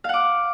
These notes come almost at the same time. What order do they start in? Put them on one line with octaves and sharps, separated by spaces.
F5 F#5 D6